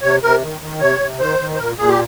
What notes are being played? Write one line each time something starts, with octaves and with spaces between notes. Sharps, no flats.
C3 C#5
C3 A#4
D#3
D#3
C3 C#5
C3
D#3 C5
D#3
C5
A#2 A#4
A#2 G#4
G4